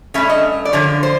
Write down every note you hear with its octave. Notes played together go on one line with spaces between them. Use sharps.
G2 E3 A3 C#4 E5
D#5
D5
F#2 D3 F3 C#5
C5